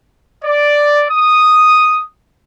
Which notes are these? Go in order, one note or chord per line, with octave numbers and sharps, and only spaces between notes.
D5
D#6